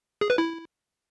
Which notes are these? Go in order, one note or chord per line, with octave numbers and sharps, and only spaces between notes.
G#4
B4
E4